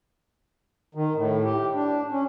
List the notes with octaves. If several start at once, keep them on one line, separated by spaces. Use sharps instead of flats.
D#3
A2
G4
D4
C#4